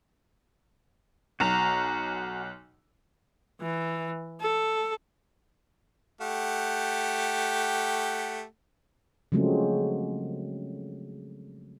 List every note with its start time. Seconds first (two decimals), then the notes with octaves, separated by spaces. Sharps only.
1.40 B1 F#4 A#5
3.61 E3
4.41 A4
6.21 A3 G4 F#5
9.32 C#3 F3 F#3 G#3 A3 C4